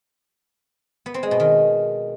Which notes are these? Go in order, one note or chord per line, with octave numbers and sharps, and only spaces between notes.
B3
C4
G#3
B2
D#3